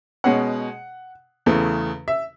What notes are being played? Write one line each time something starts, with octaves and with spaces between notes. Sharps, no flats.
B2 G#3 C#4 F#5
E2 C#3 E3 A3
E5